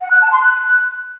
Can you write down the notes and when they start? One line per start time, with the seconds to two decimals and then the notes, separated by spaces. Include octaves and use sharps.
0.01 F#5
0.11 F#6
0.21 A5
0.32 C6
0.42 F#6